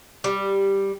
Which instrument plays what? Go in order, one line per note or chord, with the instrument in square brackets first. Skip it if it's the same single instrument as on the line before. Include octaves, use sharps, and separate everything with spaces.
[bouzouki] G3